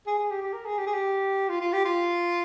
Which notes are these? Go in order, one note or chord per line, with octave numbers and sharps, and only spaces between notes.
G#4
G#4
G4
G4
A#4
G#4
G4
G#4
G4
F4
F4
G4
F4